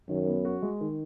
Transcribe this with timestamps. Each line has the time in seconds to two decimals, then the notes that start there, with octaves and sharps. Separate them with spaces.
0.09 F#2 D#3
0.27 B3
0.45 F#4
0.62 G#3
0.81 D#3